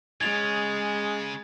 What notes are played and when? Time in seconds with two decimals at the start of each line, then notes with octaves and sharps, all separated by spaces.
0.21 C#3 G#3 G#6 A6 F7